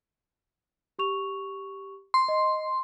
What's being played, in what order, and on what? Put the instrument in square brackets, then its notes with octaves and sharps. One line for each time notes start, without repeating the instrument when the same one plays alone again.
[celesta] G4 C#6 F7
[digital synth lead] C6
[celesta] D#5